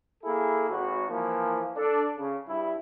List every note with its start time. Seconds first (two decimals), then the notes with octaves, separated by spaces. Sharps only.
0.24 A#3 E4 G#4 A4
0.70 G#1 F#4
1.09 E3 F3 A#3
1.77 D4 A4
2.18 C#3
2.49 G2 E4